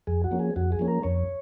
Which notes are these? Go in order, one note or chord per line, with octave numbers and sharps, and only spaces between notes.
F2 G#4
F#4
F3 A#3 C#4
G#4
F2 F#4
G#4
F3 A#3 C#4
A#4
F2 C#5